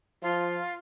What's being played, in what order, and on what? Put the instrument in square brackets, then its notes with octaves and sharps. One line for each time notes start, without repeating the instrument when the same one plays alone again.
[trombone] F3 [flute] F4